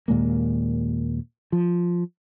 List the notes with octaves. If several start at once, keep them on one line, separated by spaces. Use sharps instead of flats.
D#2 A#2 G#3 A#3
F3